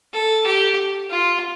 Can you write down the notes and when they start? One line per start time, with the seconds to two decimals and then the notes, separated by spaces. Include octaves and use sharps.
0.13 A4
0.46 G4
1.10 F4